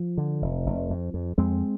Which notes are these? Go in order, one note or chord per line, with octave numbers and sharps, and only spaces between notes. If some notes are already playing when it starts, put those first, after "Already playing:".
Already playing: F3
D3
F1
F1
F2
F2
F2 G#3 C4